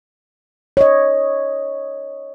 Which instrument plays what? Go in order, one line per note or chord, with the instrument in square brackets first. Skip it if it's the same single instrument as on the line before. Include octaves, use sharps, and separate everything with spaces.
[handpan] C#5 D#5